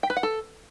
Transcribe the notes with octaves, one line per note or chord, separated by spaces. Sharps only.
G5
B4
F#5
A4